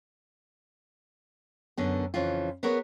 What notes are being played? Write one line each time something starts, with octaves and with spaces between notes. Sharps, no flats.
F#2 D3 B3
F2 C#3 E3 F4
B3 G#4 A#4 B4 C#5